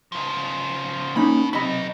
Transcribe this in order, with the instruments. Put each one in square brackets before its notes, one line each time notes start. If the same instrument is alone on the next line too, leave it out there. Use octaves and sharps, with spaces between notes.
[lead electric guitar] C#3 F3
[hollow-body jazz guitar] A#3 C#4 D#4 [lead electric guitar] F#4 B5
[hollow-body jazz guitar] C3 B5 [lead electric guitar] F#3 D#5